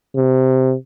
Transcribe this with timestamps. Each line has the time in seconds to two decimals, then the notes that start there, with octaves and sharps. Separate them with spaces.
0.16 C3